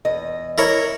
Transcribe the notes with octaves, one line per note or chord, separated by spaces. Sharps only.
E2 D#5
E4 A#4 C#5